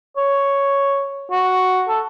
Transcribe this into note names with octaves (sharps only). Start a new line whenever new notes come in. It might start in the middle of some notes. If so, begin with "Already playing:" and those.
C#5
F#4
A4